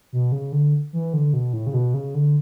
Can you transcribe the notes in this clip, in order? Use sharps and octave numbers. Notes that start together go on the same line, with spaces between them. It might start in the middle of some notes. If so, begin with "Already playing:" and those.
B2
C#3
D3
E3
D3
B2
A2
C#3
B2
C#3
D3